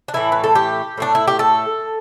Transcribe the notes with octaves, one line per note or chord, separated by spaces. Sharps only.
D4
A2 E3 A3 E4
B4
A4
G4
A2 A3 D4
E4
G4
A4